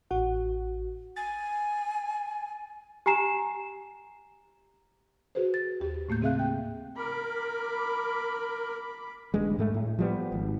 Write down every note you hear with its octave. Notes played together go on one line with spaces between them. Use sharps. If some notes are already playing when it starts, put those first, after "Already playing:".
A1 F#4 F#5
G#5 A6
G4 G#5 A#5 C7 E7
F#4 G#4 B4 C5
A6
D#2 G4
A2 A3 A#3 G6
C#3 C4 G#4 E5 F5 F#6
G5
A#4 B5 D6
D1 A1 G2 G#3
G#2 A3
A2
F3 G3 B3
G#1